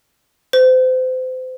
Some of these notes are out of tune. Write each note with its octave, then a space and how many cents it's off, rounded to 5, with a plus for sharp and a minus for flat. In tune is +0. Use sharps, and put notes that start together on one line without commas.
C5 -30